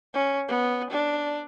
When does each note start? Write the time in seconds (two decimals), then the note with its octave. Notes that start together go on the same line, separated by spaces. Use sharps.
0.14 C#4
0.48 B3
0.90 D4